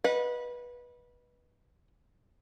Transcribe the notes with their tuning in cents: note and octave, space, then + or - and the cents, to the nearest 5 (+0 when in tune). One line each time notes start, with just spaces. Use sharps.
B4 -20 D#5 +0 F#5 -35